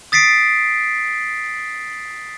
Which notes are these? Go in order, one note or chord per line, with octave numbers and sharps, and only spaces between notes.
D#6 A6 B6 C7 D7